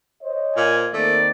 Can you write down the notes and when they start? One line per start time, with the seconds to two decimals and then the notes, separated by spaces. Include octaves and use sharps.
0.23 C5 C#5 D#5
0.57 A#2 G#5
0.93 D#3 A3 A#3 C4 D5